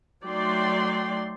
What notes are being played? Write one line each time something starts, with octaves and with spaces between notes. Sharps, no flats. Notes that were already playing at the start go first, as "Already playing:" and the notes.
F#3 A3 D#4 D5 G5 C6